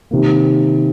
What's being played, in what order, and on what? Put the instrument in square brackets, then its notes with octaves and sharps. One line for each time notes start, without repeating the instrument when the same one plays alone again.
[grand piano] C3 D#3 A#3